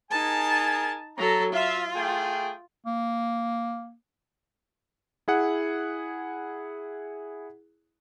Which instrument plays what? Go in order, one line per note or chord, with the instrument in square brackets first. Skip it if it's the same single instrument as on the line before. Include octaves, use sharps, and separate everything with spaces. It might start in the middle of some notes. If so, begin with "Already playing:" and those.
[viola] D#4 A5 [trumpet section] G#4 A#4 G#5
[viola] F#3 A4 [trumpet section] A#5
[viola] F4 [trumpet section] E5 F5
[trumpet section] A3 G#4 G5
[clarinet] A#3
[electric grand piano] E4 G#4 F#5